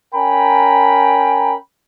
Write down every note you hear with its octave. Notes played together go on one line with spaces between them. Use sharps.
C#4 A#4 G5 G#5 A#5 B5